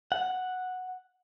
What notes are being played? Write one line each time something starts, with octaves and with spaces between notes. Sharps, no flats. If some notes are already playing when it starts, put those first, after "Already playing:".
F#5